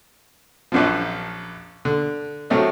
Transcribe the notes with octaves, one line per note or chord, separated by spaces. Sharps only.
A#1 F#2 F3
D3
A2 C3 F#3 A3 A#3